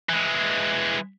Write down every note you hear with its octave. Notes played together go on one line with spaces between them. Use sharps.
E3 G#3